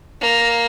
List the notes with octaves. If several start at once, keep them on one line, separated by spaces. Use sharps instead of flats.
A#3